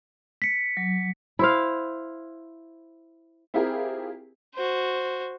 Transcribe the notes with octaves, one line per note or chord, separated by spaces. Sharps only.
B6 C#7
F#3
E4 C5 F5
C4 E4 F4 G4 G#4 A#4
F#4 C5